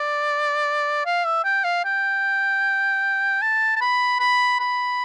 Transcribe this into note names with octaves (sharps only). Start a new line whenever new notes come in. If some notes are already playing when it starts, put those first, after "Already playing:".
Already playing: D5
F5
E5
G5
F5
G5
A5
A5
B5
B5
B5